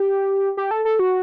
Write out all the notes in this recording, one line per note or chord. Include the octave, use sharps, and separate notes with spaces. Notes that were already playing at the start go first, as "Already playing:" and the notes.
Already playing: G4
G4
A4
A4
F#4